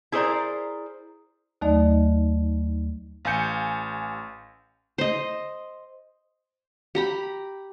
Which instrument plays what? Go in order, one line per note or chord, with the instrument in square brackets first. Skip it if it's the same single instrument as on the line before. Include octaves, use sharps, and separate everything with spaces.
[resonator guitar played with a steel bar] E4 G#4 A#4 C5 D5 A#5
[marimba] D#2 F#3 A3 D#4 D5 D#5
[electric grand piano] A1 F5 G#5 G6 C#7
[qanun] C5 D#5
G4 A#5 B5